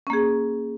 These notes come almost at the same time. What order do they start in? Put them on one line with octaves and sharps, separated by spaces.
C#4 A#3 G#4